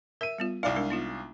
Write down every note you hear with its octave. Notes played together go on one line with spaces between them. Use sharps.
A#4 E5 D#7
G3 B3 F4
C2 D#4 D5 F5
G#3 D4 A#4
B3 D#4 F4